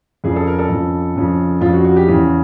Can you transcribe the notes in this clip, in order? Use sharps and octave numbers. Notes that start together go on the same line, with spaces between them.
F2 C#3 F3 G#4
A4
A#4
A4
F2 C#3 F3
F2 C#3 F3
F2 C#3 F3 F4
F#4
F#4
G4
E2 C#3 E3